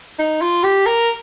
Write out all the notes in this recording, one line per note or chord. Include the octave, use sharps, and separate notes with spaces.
D#4
F4
G4
A#4